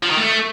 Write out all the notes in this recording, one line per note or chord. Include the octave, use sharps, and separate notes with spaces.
F3
D#3
A3